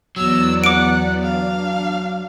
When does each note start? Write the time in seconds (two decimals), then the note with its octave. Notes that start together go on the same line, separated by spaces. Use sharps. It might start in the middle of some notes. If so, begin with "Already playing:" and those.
0.16 E2 F#3 B3 D5 E6
0.64 F#5 D6 D7
1.23 D4 F5